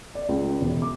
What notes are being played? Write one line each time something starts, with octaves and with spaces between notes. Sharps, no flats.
D5
C#2
E1
D6